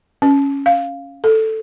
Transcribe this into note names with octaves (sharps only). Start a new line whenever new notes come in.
C#4
F5
A4